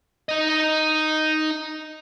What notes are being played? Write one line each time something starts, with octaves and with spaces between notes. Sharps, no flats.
D#4 D#5